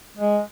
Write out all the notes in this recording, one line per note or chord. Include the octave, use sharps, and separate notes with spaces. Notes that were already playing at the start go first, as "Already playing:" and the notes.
G#3